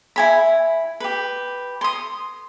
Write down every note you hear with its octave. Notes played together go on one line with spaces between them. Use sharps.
E4 G#5 B5
G4 B4
C6 D#6